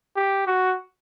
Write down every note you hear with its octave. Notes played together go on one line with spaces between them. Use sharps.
G4
F#4